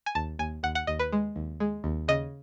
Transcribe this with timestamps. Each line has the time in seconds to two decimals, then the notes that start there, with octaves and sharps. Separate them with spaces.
0.06 G#5
0.15 D#2 A5
0.39 D#2 G#5
0.63 D#2 F#5
0.75 F#5
0.87 D#2 D#5
0.99 B4
1.12 G#3
1.36 D#2
1.60 G#3
1.84 D#2
2.08 C#3 D#5